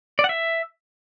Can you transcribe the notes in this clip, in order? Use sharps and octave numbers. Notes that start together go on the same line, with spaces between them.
D5
F#5
E5